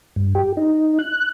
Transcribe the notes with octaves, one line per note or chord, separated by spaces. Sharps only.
G2
G4
D#4
F#6